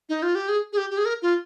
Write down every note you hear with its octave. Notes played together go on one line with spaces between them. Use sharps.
D#4
F4
G4
G#4
G#4
G4
G4
G#4
A#4
F4